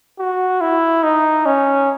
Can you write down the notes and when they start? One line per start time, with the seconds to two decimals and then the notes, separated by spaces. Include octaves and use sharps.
0.19 F#4
0.61 E4
1.03 D#4
1.46 C#4